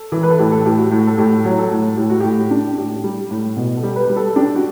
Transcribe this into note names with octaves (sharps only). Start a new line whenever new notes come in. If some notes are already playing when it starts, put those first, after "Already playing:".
Already playing: A4
E3
B4
A4
A2 G4
A4
A2 G4
F#4
A2
A4
A2 G4
F#3
A4
A2
A2 G4
F#4
A2 G4
D4
A2 G4
G3
A2
B2
A4
G3
B4
G3
A4
D4 G4
F#4